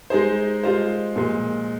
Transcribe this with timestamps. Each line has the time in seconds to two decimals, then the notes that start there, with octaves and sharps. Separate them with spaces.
0.10 G#3 D#4 G#4 C5
0.63 G#3 F4 C5
1.16 A#2 F3 G#3